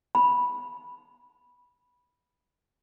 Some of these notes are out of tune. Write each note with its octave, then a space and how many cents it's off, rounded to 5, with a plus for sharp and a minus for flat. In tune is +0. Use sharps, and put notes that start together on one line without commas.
B5 -10